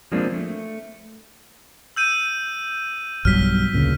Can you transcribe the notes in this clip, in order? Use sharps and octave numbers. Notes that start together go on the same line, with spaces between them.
F3 G#3 A#3 C4 D4
A3
E6 G6 D#7
B1 G2 F#3 F6 B6
D2 A#2 C#3